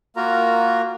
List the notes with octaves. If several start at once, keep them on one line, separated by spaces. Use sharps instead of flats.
A#3 F4 F#4 A#4 A#5